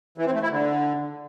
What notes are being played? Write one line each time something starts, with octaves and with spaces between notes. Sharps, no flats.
E3
C4
A3
E4
D3